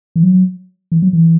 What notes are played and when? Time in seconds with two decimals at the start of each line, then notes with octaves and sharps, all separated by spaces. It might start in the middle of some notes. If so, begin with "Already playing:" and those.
0.16 E3
0.23 F#3
0.92 E3
1.02 F#3
1.13 E3